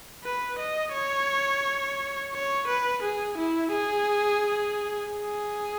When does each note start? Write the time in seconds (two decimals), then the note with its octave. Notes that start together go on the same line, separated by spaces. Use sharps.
0.24 B4
0.59 D#5
0.94 C#5
2.34 C#5
2.68 B4
3.03 G#4
3.38 E4
3.73 G#4
5.12 G#4